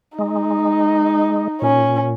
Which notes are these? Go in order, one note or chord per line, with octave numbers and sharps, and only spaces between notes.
G#3 D#4
A#2 C#4